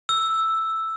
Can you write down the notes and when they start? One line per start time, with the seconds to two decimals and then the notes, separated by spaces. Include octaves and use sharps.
0.09 E6